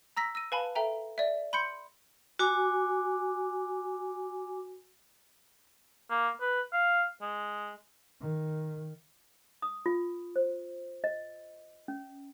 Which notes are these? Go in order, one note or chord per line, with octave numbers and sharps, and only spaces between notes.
A#5 E6 A#6 B6
E6 A#6 D#7
B4 F5 G#5 A5 B5
A4 E5 G5 A#5
D5 E5
B5 C6 G6 C#7
F#4 G#5 D6
A#3
B4
F5
G#3
D#3
D#6
F4
C5
D#5
C#4